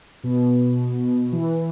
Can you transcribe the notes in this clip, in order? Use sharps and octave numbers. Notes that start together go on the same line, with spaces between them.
B2
E3